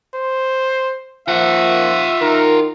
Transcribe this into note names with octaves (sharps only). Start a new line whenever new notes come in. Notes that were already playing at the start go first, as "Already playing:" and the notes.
C5
F3 A#3 F4 E5 F#5
D#3 A#4